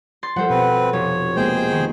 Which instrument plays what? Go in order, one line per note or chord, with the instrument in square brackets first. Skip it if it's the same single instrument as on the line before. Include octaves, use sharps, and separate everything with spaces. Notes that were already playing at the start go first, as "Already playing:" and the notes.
[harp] C6 A6
[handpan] F3 G3 [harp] A4 C5 F#5
[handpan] B2 [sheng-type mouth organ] C4 B4
[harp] F1 [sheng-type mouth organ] C#5
[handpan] G#3 A#3 B3 [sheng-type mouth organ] G#4 C5 G5
[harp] D#3